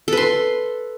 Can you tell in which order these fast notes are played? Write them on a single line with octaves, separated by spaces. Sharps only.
A4 B4 C6